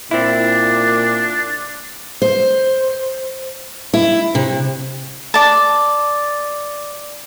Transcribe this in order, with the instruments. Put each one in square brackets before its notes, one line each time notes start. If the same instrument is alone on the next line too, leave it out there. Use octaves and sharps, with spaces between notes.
[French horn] A#2 [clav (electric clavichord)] C4 E4 [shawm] D4
[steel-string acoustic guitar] C5
E4
C3
[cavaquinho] D5 A5